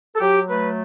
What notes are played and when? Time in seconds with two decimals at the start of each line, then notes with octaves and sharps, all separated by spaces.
0.15 A4
0.21 F#3 G4
0.49 A3 B4